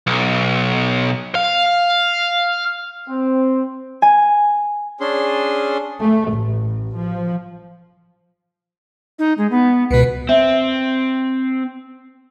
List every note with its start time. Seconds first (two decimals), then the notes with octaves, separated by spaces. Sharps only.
0.07 B1
1.35 F5
3.09 C4
4.02 G#5
5.00 C#4 D4 G#4 C6
6.00 A3
6.32 A1
6.97 F3
9.19 D#4
9.38 G#3
9.51 B3
9.91 C#2 B2 B4
10.29 C4 E5